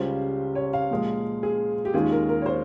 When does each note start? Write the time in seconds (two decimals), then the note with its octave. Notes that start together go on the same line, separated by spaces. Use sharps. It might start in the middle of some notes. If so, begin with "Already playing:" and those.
Already playing: C#2 C#3 G3 C#4 F4 C5
0.55 C#5
0.73 F5
0.91 A#2 F3 G#3
1.43 G#4
1.85 G4
1.94 D#2 D#3 G#3 C#4 F4 G#4
2.12 A#4
2.29 A#4
2.42 C#5
2.46 C5